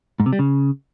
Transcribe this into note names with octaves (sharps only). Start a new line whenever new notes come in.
G#2
C3
G3
C#3